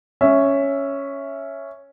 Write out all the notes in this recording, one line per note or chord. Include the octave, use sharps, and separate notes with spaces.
C#4 E5